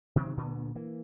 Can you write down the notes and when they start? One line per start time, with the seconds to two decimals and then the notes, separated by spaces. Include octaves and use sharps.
0.16 C3 D#3 F#3 C4
0.37 D2 A#2 D3 B3
0.75 E3 A#3